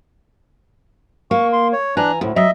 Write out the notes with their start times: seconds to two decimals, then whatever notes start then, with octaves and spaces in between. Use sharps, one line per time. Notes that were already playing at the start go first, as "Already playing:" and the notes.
1.31 A#3 C#6
1.53 C6
1.73 C#5
1.97 E3 D4 G#5 A#5 F#6
2.21 D2 A2
2.36 F#3 D#5 E5